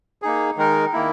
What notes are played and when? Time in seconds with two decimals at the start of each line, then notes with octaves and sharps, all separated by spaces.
0.22 A#3 D#4 G#4
0.57 D#3 G#3 D#4 A#4
0.93 D#3 A#3 E4